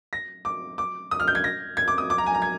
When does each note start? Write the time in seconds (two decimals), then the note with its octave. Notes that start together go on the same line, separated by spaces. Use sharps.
0.13 A#6
0.45 D6
0.78 D6
1.11 D#6
1.20 F6
1.28 G6
1.35 G#6
1.44 A#6
1.77 G#6
1.88 D6
1.98 D#6
2.10 D6
2.18 A#5
2.26 G#5
2.35 A#5
2.42 G#6